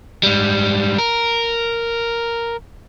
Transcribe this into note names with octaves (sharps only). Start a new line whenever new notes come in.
G#2 G3
A#4